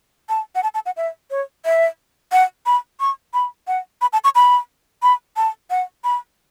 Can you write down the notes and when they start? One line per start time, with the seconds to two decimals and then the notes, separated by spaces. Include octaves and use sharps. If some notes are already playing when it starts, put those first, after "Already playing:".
0.29 A5
0.55 F#5
0.63 A5
0.74 A5
0.86 F#5
0.97 E5
1.30 C#5
1.65 E5
2.32 F#5
2.66 B5
3.00 C#6
3.34 B5
3.67 F#5
4.01 B5
4.13 A5
4.24 C#6
4.35 B5
5.03 B5
5.37 A5
5.70 F#5
6.04 B5